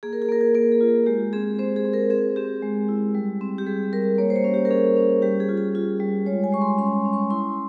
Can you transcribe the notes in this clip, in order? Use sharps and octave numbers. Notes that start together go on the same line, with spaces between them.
A#3 G#4
A#4
G#4
A#3 A#4
G#4
A#3 A#4
G#4
F4
G#3 G4
C4 G#4
C4 C5
G#4
C4
A#4
C4 G#4
C4 G4
G#3
E4
G3
C4
G4
G3 G#4
G3 A#4
A#3 C#5
C5
C#5
C#4
G4
A#4
C#4 G#4
C#4
G3 G4
G#4
F4
G#4
F4
G3
G#3 C#5
G#5
G#3 C#6
C6
C#4 C6
C#4
C#6
E4 C6